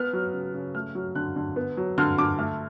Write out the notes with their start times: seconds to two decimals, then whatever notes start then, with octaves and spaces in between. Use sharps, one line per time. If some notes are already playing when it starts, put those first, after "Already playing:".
Already playing: B3 F6
0.13 F#3
0.33 C#3
0.54 C#3
0.75 A3 F6
0.95 F#3
1.15 D3 F#6
1.36 D3
1.56 B3
1.77 F#3
1.98 D3 F6
2.18 D3 D6
2.39 A3 F6